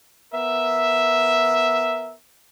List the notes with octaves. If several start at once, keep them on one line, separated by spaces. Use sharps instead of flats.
B3 A#4 E5